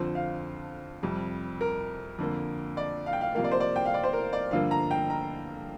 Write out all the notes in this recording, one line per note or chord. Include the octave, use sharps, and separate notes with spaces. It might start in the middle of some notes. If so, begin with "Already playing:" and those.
Already playing: F2 D3 F3 C5
F5
F2 C3 G3
A#4
F2 D3 A#3
D5
F5
G5
F5
C3 F3 A#3 F5
D5
C5
D5
G5
F5
D5
C5
A#4
D5
G2 D3 F3 A#3 F5
A#5
G5
A#5